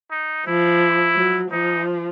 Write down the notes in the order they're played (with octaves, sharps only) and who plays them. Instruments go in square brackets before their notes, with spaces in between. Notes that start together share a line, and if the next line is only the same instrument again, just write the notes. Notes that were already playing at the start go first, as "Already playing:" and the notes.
[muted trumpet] D#4
[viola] F3 [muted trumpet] E4
[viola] F#3
[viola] F3 [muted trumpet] D#4